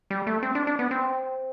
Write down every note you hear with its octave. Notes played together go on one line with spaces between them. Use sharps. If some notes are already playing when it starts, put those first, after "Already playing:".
G3
A3
C4
D4
D4
B3
C4